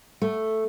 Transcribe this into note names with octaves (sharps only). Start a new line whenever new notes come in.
A3